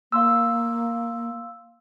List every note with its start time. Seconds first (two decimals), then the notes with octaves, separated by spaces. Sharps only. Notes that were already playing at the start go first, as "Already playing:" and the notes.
0.12 A#3 F5 C6 E6